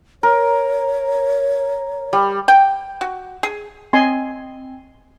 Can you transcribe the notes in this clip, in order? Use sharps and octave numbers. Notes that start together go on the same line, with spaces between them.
A#4 C#5
G3
G5
F#4
G#4
C4 D#5 G#5 C6